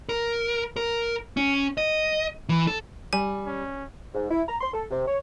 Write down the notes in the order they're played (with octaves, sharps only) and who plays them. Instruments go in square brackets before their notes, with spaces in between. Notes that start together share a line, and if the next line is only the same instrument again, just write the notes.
[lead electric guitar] A#4
A#4
C#4
D#5
E3
A4
[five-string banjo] G3 [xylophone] G#5
[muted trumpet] C#4
[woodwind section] G#2
E4
A#5
C6
A4
C3
C#5